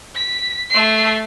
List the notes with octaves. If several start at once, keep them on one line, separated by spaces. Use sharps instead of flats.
B6
A3 C7